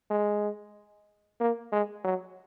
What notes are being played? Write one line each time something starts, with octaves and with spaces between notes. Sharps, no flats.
G#3
A#3
G#3
F#3